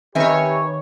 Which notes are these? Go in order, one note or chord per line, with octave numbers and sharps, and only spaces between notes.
D#3 C4 G4 B4 C#5 E5 G#5